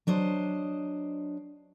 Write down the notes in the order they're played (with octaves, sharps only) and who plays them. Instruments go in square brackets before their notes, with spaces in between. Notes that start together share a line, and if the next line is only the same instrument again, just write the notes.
[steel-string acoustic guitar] F#3 D4 C5 D#5